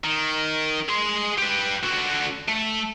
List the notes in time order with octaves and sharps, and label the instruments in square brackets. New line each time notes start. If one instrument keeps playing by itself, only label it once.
[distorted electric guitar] D#3
G#4 C6
G4 B4
D3 F#4
A3